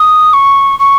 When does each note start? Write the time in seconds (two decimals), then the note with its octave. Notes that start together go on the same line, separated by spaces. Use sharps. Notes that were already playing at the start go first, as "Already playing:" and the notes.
Already playing: D#6
0.33 C#6
0.79 C#6